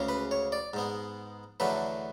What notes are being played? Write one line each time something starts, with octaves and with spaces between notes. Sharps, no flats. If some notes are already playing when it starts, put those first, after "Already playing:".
Already playing: D2 C#3 G#3 C#4
B4
C#5
D5
G#2 G#3 B3
E2 D3 F#3 A3 B4